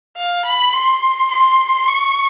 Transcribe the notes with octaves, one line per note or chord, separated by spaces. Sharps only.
F5
B5
C6
C6
C#6